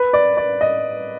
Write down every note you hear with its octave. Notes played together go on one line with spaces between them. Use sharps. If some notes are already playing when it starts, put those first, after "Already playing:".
Already playing: B4
D5
D5
D#5